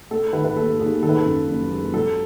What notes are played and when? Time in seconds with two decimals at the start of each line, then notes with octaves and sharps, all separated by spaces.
0.11 A3 A4
0.33 D#3 B4
0.44 B4
0.56 D#2 A4
0.79 D#2 G#4
1.02 D#3 A4
1.09 B4
1.17 A4
1.25 F#2
1.48 F#1
1.71 G#3
1.93 F#3 A4